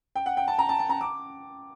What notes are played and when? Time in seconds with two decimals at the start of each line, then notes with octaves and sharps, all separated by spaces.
0.16 G5
0.26 F#5
0.37 G5
0.48 A5
0.59 A#5
0.69 A5
0.79 A5
0.90 A#5
1.01 D6